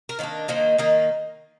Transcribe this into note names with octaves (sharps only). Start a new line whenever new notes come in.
A#4
D#3 A#3 D4 C5
D#3 A#3 D#4 C5
D#3 A#3 D#4 D#5